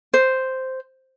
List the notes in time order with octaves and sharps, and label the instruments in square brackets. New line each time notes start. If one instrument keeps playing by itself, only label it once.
[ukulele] C5